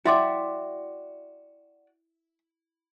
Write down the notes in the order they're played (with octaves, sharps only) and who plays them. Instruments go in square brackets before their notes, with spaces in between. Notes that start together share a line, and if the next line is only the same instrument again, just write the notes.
[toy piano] E4 C6 D6 [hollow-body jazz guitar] F#4 D5 G5 [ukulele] E5